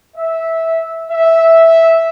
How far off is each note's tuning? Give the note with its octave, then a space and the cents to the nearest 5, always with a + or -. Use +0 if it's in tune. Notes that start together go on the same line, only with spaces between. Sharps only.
E5 -10
E5 -5